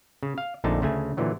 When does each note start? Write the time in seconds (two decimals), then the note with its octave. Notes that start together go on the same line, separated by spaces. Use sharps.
0.23 C#3
0.38 F5
0.64 A#1 F2 D3 A3 D#4 A5
0.81 D2 C#3 A3 G#5
1.17 A#2 D3 E3 F#3